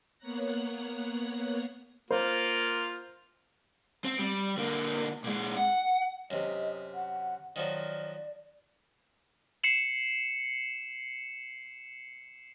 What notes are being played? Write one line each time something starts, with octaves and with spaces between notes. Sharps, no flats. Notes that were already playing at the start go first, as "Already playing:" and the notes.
A#3 B3 C#5 A#5 F#6 A#6
A#3 F4 C5
C4
G3
D3 A#3
A#2 G#3
F#5
F#2 C3 D#5
F#5
D#3 F3 F#3 D5
C7 C#7 E7 F#7